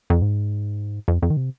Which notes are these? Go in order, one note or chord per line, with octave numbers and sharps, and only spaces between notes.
F2
G#2
F2
F2
D#3
C3